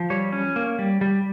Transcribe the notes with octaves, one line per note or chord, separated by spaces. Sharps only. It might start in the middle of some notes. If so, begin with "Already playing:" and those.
Already playing: F3
G3 C#5
C#4
A#3
G3
G3